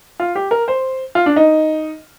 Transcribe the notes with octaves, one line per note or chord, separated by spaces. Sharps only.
F4
G4
A#4
C5
F4
D4
D#4